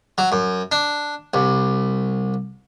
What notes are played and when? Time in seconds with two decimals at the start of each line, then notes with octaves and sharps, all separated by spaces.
0.18 F#3
0.32 F#2
0.72 D4
1.34 C2